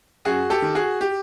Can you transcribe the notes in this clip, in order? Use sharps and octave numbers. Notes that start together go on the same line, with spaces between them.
F#2 F#4 G#4
G4 A4
D#3
F#4 G#4
G4